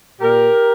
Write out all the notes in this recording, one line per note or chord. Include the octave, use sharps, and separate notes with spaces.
A#2 G4 A#4